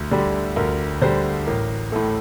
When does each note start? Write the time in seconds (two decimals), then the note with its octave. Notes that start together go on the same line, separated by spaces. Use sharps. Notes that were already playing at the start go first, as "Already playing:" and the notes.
Already playing: D2
0.11 D3 G3
0.56 D2 A#4
1.01 D3 G3 C5
1.47 A1 A#4
1.92 A2 A3 A4